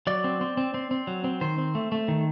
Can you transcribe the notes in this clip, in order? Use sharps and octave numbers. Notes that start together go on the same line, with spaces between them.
F#3 D5
C4
C4
C4
C4
C4
F#3
C4
D#3 C5
C4
A3
A3
D#3